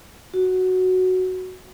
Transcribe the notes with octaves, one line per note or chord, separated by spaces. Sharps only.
F#4